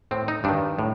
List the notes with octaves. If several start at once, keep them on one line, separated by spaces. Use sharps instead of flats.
A2 C4
D#4
G2 D#3 D4
A2